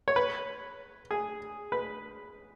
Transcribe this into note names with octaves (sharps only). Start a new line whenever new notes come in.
C#5
B4
G#4
B4